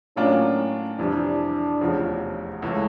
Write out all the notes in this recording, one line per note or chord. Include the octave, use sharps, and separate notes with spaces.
A2 F#3 A#3 C#4 D4 F4
F2 C3 E3 G3 D4
F1 E2 C#3 F3
C#2 C#3 E3 A3